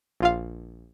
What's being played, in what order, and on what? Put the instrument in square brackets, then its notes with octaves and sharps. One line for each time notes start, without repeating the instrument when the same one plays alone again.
[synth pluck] A#1 F4 F5